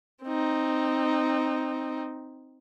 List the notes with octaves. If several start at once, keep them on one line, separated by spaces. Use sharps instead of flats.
C4 D#4